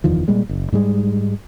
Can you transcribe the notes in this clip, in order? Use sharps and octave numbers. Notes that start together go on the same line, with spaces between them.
F#1 E2 D#3 F3
A#2 G3 G#3
F#1
G#2 G3 G#3